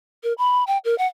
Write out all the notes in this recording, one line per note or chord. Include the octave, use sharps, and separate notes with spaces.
A#4
B5
G5
A#4
F#5